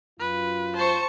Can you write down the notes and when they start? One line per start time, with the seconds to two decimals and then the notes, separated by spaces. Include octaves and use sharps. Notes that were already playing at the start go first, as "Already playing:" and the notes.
0.20 F#2 F4 B4
0.77 C5 A5 C#6